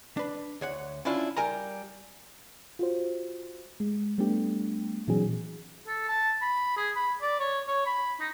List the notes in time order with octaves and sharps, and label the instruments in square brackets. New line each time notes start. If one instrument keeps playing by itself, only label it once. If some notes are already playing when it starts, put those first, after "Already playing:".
[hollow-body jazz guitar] D4 B4
D2 C#5 F#5
C#4 D4 E4 F4
G3 A#4 G#5 A#5
[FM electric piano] F4 F#4 C5
G#3
G3 A3 B3 D4 G4
A#2 E3 F#3 C4 D4 G#4
[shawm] A4
A5
B5
G#4
B5
D5
C#5
C#5
B5
D#4